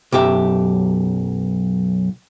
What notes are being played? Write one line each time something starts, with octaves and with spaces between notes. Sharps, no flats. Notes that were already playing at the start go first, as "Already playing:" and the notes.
B1 F#2 G4 E5